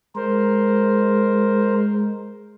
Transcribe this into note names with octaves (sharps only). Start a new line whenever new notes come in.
G#3 A#4 C5